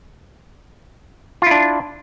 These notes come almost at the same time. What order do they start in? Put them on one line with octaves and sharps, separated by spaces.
F4 E4 D4